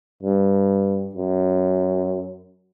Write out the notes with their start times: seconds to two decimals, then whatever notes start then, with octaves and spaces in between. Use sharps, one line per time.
0.22 G2
1.15 F#2